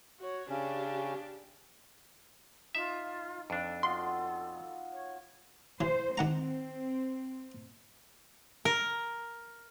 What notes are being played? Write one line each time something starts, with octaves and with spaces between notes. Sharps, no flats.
F#4 C#5
C#3 C#4 D4 G4
D#4 F4 E5
F2 D4 A4
B3 F4 F#4 C6
C#5
E3 C5
D#3 C4 F#5 A#5
A#4